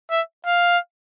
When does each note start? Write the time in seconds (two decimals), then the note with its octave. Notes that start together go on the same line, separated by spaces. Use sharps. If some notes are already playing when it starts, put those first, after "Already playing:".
0.11 E5
0.46 F5